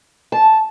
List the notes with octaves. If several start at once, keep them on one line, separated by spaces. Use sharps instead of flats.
A5